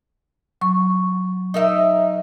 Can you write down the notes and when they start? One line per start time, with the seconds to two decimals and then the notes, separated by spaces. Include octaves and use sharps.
0.61 F#3 C#6
1.54 D#4 A#4 E5